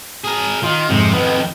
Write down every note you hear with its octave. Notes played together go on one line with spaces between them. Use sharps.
G#4 A#4
D#3 F4
F2 G#2 C3
F2 D#3 B3